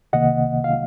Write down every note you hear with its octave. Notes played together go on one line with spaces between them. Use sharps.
C2 C3 D#3 A#3 D#5 F#5
F5